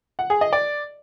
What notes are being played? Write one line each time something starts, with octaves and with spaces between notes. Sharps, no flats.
F#5
G#4
D#5
D5